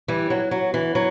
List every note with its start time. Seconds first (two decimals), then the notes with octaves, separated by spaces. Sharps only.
0.08 E3 G3
0.30 F#3
0.51 F#3
0.74 E3
0.95 F#3